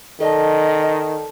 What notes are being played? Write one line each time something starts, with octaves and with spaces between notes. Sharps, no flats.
D#3 A4 D5 D#5 A5